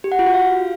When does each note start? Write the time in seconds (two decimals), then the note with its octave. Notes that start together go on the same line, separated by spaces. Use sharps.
0.04 G4
0.12 F#5
0.19 F4
0.26 F#4
0.34 F5